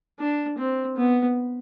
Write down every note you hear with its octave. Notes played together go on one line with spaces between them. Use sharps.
D4
C4
B3